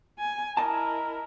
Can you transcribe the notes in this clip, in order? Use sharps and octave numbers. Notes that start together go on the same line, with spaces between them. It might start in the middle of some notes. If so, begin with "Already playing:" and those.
G#5
E4 A#4 D#5 A5